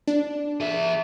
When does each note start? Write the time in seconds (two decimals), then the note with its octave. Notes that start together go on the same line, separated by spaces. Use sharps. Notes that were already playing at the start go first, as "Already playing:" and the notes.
0.07 D4
0.60 G#4 E5